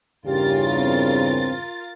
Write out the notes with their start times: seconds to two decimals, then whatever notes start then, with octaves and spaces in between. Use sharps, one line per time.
0.26 E2 G2 C#3 F4 G4 A#4 A6
0.77 C4